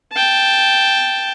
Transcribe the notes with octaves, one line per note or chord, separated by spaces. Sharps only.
G5 A5